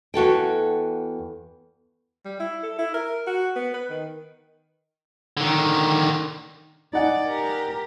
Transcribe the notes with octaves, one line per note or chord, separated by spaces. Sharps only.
E2 F#4 A4 G5
G3
E4
A4
E4
A#4
F#4
B3
B4
D#3
D3 D#3
D#4 D5 F#5 G#5
G4 A#4